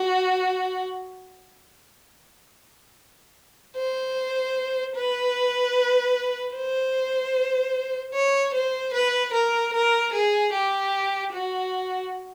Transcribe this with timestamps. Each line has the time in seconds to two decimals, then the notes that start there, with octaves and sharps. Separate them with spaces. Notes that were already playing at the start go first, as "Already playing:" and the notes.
Already playing: F#4
3.77 C5
4.96 B4
6.55 C5
8.14 C#5
8.54 C5
8.94 B4
9.33 A#4
9.73 A#4
10.13 G#4
10.53 G4
11.32 F#4